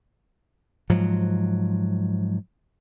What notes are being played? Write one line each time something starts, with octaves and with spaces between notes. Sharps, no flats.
G#2 F3 F#3